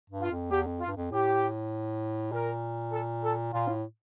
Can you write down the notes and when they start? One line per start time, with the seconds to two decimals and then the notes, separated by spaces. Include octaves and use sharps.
0.10 G2
0.21 F4
0.31 F2
0.51 E2 G4
0.66 F2
0.80 F4
0.88 G2
0.96 F2
1.11 A2 G4
2.32 A#2 A#4
2.92 A4
3.23 A4
3.53 A#2 F4
3.68 A2